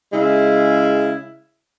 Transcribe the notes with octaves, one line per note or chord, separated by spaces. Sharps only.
C#3 G#3 E4